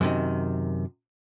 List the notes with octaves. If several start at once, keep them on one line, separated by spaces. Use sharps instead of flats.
F#2 C3 D#3